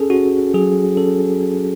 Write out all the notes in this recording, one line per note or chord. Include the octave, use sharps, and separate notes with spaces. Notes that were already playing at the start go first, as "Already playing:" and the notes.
Already playing: C#4 G#4 A4
C#4 F#4
F#3 G#4
C#4 A4